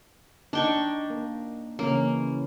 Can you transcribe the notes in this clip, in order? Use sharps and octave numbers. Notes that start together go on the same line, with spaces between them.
D4 D#4 G5 C#6
A#3
C#3 E3 A#3 C#4